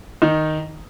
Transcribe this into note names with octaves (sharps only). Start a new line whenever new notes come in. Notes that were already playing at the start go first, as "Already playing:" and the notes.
D#3 D#4